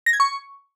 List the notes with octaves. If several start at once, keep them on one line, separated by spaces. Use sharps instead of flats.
A#6
G#6
C#6